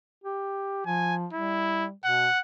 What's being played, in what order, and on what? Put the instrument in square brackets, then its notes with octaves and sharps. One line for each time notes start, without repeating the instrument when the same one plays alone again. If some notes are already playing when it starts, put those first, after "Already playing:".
[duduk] G4
[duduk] F3 [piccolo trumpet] G#5
[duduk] G3 [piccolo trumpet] E4
[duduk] B2 [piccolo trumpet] F#5